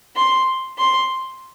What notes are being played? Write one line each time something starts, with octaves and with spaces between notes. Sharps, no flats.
C6
C6